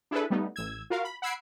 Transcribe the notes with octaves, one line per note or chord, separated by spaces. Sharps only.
D4 E4 G#4 A4 B4
G3 A3 B3 D#4
A1 E6 G#6
F4 F#4 A#4 F5
B5
F#5 B5 E6 G#6 C7 D7